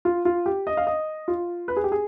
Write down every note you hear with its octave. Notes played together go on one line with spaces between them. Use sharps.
F4
F4
G4
D#5
F5
D#5
F4
B4
G#4
G4
G#4